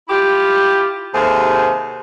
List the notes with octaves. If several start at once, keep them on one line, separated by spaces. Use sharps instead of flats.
E4 F4 G4
D#2 C3 A3 G#4 C5